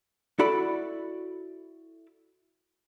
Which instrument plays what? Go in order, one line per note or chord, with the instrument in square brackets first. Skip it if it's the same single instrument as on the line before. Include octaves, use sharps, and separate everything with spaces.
[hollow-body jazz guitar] E4 F#4 A4 D5 B5